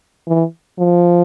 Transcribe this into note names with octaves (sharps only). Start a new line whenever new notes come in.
E3
F3